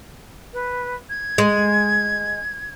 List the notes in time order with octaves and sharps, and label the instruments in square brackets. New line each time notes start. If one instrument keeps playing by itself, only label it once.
[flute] B4
G#6
[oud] G#3